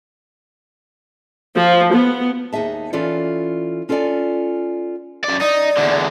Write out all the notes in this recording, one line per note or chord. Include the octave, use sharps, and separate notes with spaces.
F3
B3
D#2 D#4 G#4 E5 A5
E3 C#4 F4 A4 D5
C#4 F4 A4 A#4 D5 G#5
F#2 D5
D#4 D5
E2 D3